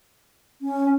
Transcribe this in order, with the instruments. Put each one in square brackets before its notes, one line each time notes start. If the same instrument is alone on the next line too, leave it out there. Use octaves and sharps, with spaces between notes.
[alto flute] C#4